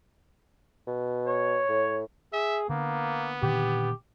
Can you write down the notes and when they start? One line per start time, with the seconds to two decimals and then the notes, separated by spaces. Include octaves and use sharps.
0.87 B2
1.27 C#5
1.68 A2
2.33 G#4 E5
2.69 D3 A#3 B3
3.43 A#2 D3 D#3 G4